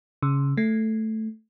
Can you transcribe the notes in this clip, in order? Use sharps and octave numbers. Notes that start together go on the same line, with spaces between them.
C#3
A3